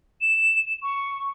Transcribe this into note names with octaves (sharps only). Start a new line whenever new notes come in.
E7
C#6